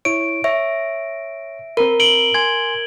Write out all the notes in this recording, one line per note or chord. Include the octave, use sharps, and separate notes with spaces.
E4 C#5 D7
C#5 E5
C4 A#4 A#5 B5
D7 F#7 G7
G#5 C6 G#6